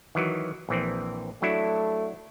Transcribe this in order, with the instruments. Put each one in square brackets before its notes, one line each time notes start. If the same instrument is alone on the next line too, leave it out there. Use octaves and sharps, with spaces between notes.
[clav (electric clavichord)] D#3 E3 F#3
A#1 E3 C4
[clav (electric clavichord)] F#3 D4 E4 [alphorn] A3